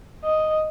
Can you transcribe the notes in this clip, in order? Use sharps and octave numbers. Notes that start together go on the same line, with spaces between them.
D#5